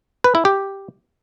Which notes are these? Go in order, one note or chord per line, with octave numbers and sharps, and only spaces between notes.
B4
E4
G4